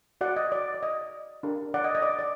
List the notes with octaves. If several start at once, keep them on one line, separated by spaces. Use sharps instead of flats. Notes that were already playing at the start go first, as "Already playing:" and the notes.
F#4 C5 D5 F#5
D#5
D5
D5
D#5
D4 G4 A#4
D5 F#5
D#5
D#5
D5
D5